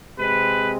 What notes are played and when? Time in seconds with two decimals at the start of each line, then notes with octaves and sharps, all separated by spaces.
0.19 C3 G#3 C4 B4